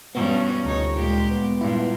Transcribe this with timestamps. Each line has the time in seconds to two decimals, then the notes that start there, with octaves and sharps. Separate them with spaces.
0.15 G2 B2 B3 C#4
0.65 F1 D2 D#4 C#5
0.96 A#2 G#3 G4
1.31 B3
1.61 G2 A#2 E4 F4